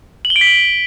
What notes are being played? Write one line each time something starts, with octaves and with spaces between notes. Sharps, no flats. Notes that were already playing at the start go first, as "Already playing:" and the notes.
F#7
G7
D7
B6
F#7